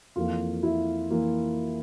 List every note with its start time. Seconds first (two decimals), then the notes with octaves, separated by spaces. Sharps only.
0.16 F2 E3 A#3 F4
0.63 E4
1.11 E3 A#3